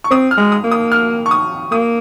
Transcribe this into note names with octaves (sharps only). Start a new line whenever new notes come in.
C#6
C4 D#6
F6
G#3
D#6
A#3
D#6
F6
C#6
D#6
A#3 D#6